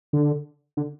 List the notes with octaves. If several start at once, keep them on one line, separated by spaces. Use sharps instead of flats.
D3
D3